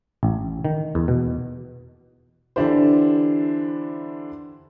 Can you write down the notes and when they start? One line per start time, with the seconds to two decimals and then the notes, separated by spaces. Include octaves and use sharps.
0.23 A1
0.65 D#3
0.95 E2
1.08 B2
2.56 D3 E3 D4 E4 G4 C5